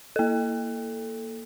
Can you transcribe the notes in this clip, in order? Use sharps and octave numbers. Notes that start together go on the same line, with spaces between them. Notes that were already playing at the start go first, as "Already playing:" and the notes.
A#3 A4